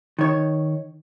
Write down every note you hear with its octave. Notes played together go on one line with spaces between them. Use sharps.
D#3 C#5